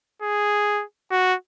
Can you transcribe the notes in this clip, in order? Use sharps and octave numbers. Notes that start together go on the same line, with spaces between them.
G#4
F#4